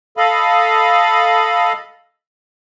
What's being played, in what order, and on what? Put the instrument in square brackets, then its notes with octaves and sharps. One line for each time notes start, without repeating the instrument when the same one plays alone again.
[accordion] A4 D#5 F5 B5